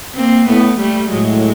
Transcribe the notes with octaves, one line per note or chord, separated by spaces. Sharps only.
A#3 C4
A2 A3 B3
G3 A3
A2 F#3 G#3